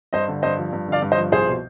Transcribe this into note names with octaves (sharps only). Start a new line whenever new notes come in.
G2 C5 D#5
D3
G2 C5 D#5
F3
G2
D3 D5 F5
G2
C5 D#5
F3
C2 G#4 C5
B2